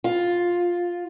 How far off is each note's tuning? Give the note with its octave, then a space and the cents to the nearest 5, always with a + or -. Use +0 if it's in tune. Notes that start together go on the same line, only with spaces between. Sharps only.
F4 +5